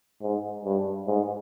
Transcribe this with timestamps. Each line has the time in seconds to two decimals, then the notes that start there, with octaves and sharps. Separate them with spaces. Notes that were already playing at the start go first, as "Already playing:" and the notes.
0.22 G#2
0.65 G2
1.07 G#2